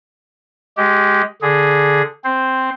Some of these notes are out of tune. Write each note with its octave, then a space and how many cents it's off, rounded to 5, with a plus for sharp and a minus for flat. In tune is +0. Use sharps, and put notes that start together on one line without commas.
G#3 +0 G4 -20
D3 +0 G#4 +0
C4 +0 C5 +0